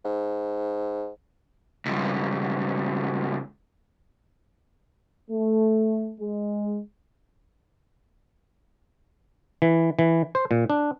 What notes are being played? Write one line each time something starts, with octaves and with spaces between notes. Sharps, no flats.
G#2
C#2 G2
A3
G#3
E3
E3
C5
A#2
D4